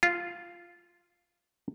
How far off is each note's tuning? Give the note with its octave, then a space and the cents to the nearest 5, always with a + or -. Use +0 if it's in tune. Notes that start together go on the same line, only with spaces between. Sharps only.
F4 -5